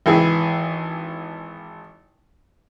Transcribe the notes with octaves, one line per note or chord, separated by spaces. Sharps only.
G#1 E3 E4 G#4